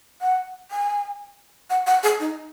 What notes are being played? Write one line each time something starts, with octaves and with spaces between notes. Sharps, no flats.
F#5
G#5
F#5
F#5
G#4
D#4